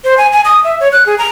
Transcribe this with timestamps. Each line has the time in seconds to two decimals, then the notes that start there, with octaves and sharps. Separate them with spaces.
0.04 C5
0.17 G#5
0.32 G#5
0.45 D#6
0.64 E5
0.80 C#5
0.92 F#6
1.06 G#4
1.18 A#5